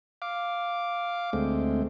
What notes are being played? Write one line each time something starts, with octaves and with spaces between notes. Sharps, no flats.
F5 D6
D2 G#3 A3 C4